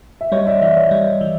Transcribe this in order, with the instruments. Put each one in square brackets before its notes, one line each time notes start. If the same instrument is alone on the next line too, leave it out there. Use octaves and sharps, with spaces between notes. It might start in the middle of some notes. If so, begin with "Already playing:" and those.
[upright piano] E5
[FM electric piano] G3 [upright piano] C#5 D#5
[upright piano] D5 E5
[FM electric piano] E3 [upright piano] D5 E5
[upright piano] C#5 D#5
[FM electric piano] G3
E3